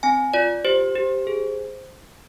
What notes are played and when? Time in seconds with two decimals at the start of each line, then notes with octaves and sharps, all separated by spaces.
0.03 C4 G#5
0.34 F4 D5
0.65 G4 C5
0.96 G4
1.27 G#4